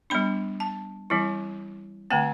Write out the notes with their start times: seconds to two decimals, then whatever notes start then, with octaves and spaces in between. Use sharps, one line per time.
0.10 G3 B3 D4 B5
0.60 A5
1.10 E3 G3 C4 E4
2.10 D3 A3 C4 G5